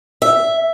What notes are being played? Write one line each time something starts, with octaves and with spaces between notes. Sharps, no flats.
E5